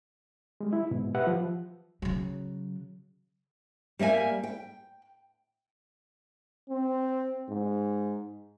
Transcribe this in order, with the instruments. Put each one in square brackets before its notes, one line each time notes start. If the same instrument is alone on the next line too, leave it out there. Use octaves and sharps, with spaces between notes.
[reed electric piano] G3 G#3
E4
G#2 B2
G4 B4 E5 F#5
F3
[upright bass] C#3 F#3
[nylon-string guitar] G3 A#3 E5 G#5
G5
[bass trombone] C4
G#2